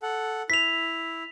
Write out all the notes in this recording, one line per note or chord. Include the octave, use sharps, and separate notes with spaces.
A4 F#5
E4 B6 F7